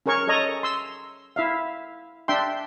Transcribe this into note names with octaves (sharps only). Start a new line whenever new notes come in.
C#4 G#4 A#4 C#5 C#6
A4 C#5 D#5 A#5
C6 E6
E4 E5 F5
D4 E5 G5 C6